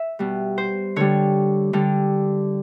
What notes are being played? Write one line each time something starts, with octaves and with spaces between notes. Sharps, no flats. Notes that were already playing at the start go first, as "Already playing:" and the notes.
Already playing: E5
B2 G3
C5
D3 G3 C#5
D3 G3